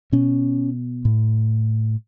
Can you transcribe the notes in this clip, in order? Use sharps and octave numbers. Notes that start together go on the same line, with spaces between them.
B2 C#4
A2